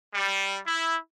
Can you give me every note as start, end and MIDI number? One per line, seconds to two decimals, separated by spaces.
0.13 0.58 55
0.66 0.95 64